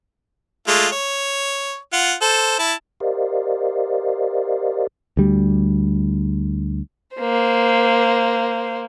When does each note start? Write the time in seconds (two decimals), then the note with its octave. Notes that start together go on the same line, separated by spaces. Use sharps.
0.68 G#3 A3 F4
0.92 C#5
1.93 F4 F#5
2.22 A4 C5
2.59 E4 A5
3.00 G4 A#4 C5 D5 D#5 F5
5.17 D2 G3
7.16 A#3 C5